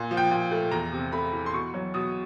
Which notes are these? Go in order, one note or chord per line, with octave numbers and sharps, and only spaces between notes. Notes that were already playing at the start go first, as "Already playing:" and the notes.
Already playing: A#2 A#3
F3
G5
A#2
A3
E2 A#5
C3
A3 B5
E3
C6
B2 C#6
F#3
B2 D#6